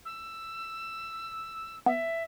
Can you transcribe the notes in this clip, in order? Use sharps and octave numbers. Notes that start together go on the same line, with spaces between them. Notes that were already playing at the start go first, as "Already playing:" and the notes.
E6
B3 E5